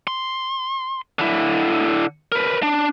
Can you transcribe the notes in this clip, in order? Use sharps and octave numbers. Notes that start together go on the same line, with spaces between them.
C6
D3 E4
A#4 B4
D4